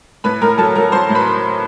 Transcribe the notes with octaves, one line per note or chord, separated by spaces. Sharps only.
A2 B4 B5
A2 A#4 A#5
F#3 A4 A5
F#3 A#4 A#5
F#3 C5 C6
A2
B4 B5